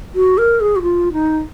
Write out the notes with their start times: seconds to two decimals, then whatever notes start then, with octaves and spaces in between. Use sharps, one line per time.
0.15 F#4
0.38 A#4
0.61 G#4
0.76 F#4
0.82 F4
1.13 D#4